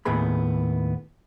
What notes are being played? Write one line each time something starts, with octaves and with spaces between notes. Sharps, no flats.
D#2 A2 B3 G#4 B5